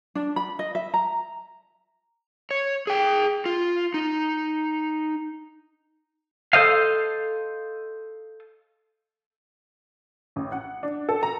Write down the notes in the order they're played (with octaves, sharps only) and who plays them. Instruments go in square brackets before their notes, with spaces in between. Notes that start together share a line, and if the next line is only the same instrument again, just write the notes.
[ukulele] D4
B5
D#5
E5
A#5
[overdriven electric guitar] C#5
G#4 G5
F4
D#4
[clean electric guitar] A4 C5 D#5 F5
[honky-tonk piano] A1
F#5
D4
A4
A#5